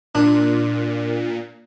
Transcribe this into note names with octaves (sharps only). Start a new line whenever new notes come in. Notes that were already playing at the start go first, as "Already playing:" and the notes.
A#2 D4